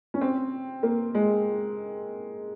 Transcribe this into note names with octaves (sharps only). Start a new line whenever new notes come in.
C#4
C4
A#3
G#3